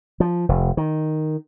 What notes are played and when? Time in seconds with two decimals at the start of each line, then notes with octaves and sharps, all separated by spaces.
0.20 F3
0.49 F1
0.77 D#3